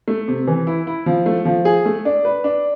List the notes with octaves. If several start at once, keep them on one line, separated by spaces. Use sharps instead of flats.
A3
C3
E3
E4
E4
F3
A3
F3
G#4
A3
D4
B4
D4